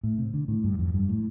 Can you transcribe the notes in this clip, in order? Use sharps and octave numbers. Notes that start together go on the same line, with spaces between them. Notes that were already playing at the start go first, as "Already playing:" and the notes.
A2
C3
D3
A2
G2
F2
G2
A2